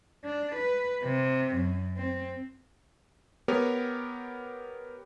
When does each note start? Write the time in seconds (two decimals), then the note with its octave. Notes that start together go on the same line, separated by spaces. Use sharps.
0.24 D4
0.56 B4
1.04 C3
1.56 F#2
1.97 C4
3.48 B3 G4 A#4 C#5